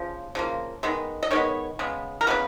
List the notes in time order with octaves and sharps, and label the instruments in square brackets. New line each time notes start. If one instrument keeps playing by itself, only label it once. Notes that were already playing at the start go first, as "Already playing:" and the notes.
Already playing: [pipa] C#3 F3
C#3 F3 A#3
D#3 G#3 B3
D#5
D#3 G#3 B3 C#5
C#3 G#3 B3
A#4
C#3 G#3 B3 B4